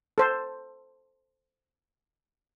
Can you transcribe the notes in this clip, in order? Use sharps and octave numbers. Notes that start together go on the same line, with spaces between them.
A4 C5